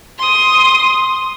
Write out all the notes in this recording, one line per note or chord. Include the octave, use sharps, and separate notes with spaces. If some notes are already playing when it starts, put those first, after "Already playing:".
C6 D#6